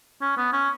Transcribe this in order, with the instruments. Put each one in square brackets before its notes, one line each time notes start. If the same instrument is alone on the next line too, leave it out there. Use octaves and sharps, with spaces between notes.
[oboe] C#4
B3
C#4